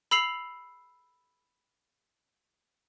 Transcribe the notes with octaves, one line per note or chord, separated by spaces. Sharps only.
B5 E6 C7 F7 F#7